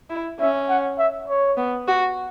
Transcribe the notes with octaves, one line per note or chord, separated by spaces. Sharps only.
E4
C#4 E5
F#5
E5
C#5
B3
F#4